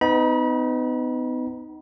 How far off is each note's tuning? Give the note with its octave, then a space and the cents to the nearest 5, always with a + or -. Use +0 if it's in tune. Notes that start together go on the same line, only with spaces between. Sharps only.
B3 +35 D#4 +0 B5 -35